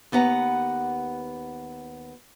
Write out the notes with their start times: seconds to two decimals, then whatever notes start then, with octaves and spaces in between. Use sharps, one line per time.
0.12 D#2 B3 B4 F#5 A#5